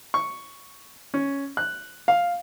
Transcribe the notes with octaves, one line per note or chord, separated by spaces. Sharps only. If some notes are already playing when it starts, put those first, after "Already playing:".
C#6
C#4
F#6
F5